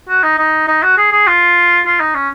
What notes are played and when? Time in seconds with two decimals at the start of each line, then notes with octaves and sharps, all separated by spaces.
0.09 F#4
0.23 D#4
0.39 D#4
0.68 D#4
0.83 F#4
0.98 G#4
1.12 G#4
1.27 F4
1.86 F4
2.00 D#4
2.15 C#4